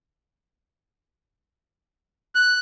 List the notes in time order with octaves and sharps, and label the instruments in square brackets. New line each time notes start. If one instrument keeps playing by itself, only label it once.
[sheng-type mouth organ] F#6